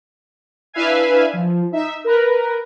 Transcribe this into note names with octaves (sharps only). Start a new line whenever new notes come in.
D4 E4 B4 E5 F5 G#5
F3
D#4 E5
A#4 B4